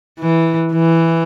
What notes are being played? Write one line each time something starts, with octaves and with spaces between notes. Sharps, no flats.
E3
E3